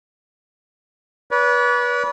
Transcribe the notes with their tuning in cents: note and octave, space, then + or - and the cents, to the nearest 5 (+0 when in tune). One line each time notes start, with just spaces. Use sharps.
B4 -20 D5 -45